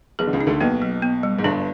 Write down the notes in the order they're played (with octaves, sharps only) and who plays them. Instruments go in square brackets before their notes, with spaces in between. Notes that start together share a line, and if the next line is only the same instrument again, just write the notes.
[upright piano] B1 B2 [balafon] G#4
[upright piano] D3
C#2 C#3
[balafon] D#4
[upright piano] D2 D3
[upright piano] B1 B2 [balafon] A#3
[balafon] F#3
B3
G3
[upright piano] G#2
[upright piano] G1 G2 [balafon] D4